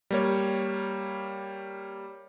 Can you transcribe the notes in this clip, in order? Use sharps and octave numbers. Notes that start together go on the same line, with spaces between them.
G3 A#3 C#5